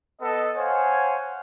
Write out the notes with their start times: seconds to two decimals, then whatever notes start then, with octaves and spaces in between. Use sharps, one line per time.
0.21 B3 A4 D#5
0.56 C5 C#5 F5 F#5 G#5